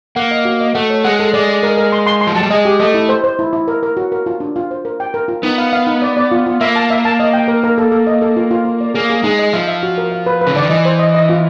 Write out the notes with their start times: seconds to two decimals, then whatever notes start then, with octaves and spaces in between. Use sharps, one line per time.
0.16 A#3 F#5
0.31 D#5
0.45 F#4
0.61 D#5
0.75 A3 F#5
0.90 C#5
1.04 G#3 F#5
1.20 A4
1.33 G#3 D5
1.49 D5
1.63 A#4
1.77 A#4
1.92 C6
2.06 C6
2.21 C6
2.27 F3
2.35 F#3 A5
2.43 G3
2.50 G#3 D#5
2.65 G4
2.80 A3 D#5
2.94 E4
3.09 C5
3.24 C5
3.39 E4
3.53 E4
3.68 A#4
3.83 A#4
3.97 F#4
4.12 A#4
4.26 F4
4.40 D4
4.56 F4
4.71 C5
4.85 A#4
5.00 G5
5.14 A#4
5.28 F4
5.43 B3 D#4
5.58 F5
5.73 F5
5.87 D#4
6.02 D5
6.17 D5
6.32 F4
6.47 F4
6.61 A#3 E5
6.76 A5
6.90 E5
7.05 A5
7.20 D#5
7.33 G5
7.48 A#4
7.64 A#4
7.78 A4
7.92 A4
8.07 D#5
8.22 A4
8.36 F4
8.51 F4
8.65 F4
8.81 D5
8.94 A#3 G#4
9.10 G#4
9.24 G#3 D#4
9.39 D#5
9.53 F3 E5
9.68 E5
9.83 F#4
9.98 A#4
10.12 F5
10.26 B4
10.41 B4
10.47 C#3
10.55 D3 D5
10.62 D#3
10.70 E3 D#5
10.85 C5
10.99 D#5
11.15 D#5
11.29 F4